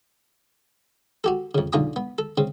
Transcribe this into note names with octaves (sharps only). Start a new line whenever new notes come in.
F#4 G4 A4
F2 C#3
B1 D3 F4 G#5 A#5 D#6
B3
A4
C#3 C4